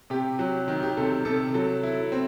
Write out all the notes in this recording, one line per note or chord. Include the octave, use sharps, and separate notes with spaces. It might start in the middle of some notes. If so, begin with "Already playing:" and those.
C3 G4
F#3
D#3
G4
C3 A4
C3 A4
F#3 A4
E4
C4